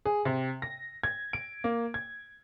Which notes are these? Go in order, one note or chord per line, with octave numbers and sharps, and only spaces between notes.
G#4
C3
A#6
G#6
D7
A#3
G#6